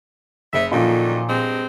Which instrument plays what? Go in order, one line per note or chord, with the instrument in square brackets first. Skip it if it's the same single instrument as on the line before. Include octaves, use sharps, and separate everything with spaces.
[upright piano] F#1 [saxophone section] C#3 E5
[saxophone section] F#2 D3 D#3 [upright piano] A#2 F3
[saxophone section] G2 G#3 C4